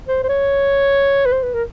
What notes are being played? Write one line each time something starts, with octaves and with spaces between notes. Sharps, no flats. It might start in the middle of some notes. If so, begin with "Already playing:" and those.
C5
C5
C#5
B4
C5
B4
A#4